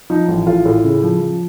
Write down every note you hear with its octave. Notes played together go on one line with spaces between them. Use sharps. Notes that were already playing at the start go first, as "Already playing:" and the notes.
F3 D#4
A1
A2 F4
A2
C#3
F3
F3